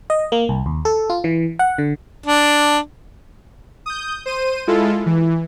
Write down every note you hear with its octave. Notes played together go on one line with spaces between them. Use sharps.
D#5
A#3
C2
D#2
A4
F4
E3
F#5
D3
D4
D#6 G6
C5 D#7
G#3 E4 F4 A4
E3